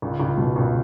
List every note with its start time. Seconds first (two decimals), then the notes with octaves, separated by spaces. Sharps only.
0.02 C#2
0.20 C#2
0.38 B2
0.56 C#2